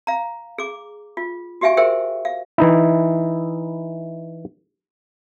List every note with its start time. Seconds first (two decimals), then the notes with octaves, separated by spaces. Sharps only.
0.07 F5 A#5
0.58 G#4 D6
1.17 F4
1.61 F#4 G4 E5 F5 G#5 C#6
1.77 G#4 A#4 C5 E5 G5
2.25 F5
2.58 E3 D#4 E4